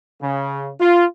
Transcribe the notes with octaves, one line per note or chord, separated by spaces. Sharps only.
C#3
F4